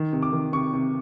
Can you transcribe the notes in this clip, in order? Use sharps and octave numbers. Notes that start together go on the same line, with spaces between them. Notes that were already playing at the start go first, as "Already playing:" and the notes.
Already playing: D#3
C3
D6
D#3
C3 C#6
C3